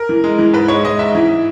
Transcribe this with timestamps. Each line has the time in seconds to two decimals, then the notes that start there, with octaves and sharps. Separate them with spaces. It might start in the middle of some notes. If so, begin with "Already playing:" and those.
Already playing: A#4
0.09 E3
0.24 G#3
0.39 E3
0.53 G#2 B4
0.68 G#3 C#5
0.85 G#3 D#5
0.99 G#2 E5
1.15 E3